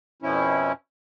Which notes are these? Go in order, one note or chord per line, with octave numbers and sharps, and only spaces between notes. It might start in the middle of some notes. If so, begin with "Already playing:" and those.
F2 B2 F3 C#4 E4